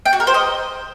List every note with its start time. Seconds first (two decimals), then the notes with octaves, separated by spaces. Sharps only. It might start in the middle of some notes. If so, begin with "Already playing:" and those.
0.06 G5
0.13 F#4
0.20 A#4
0.27 C5
0.34 D#5